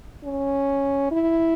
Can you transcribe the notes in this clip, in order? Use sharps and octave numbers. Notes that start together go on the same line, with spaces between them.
C#4
E4